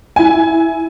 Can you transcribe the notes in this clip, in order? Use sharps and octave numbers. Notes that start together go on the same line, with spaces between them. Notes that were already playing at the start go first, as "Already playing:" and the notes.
E4 G#5